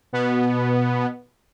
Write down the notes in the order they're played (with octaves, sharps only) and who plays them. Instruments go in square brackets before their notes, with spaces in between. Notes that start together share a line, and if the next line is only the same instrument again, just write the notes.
[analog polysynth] B2 B3